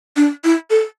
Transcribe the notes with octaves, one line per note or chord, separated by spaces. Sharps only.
D4
E4
A4